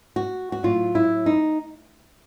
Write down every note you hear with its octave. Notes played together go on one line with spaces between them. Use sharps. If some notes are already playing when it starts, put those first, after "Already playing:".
F#4
F#4
A2 F#3 F4
E4
D#4